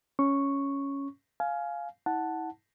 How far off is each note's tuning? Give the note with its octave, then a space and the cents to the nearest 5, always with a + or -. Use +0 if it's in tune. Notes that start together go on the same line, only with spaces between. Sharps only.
C#4 +0 C#6 +0
F5 +0 G#5 +20
E4 -35 F#5 +0 A5 +0